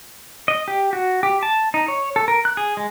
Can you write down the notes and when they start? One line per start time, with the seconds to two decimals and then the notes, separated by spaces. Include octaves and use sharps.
0.48 D#5
0.68 G4
0.93 F#4
1.23 G4
1.43 A5
1.74 D#4
1.88 C#5
2.16 A4
2.28 A#4
2.45 F#6
2.57 G#4
2.77 G#3